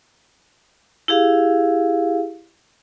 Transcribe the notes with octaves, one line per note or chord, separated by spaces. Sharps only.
E4 G4 G#4 F5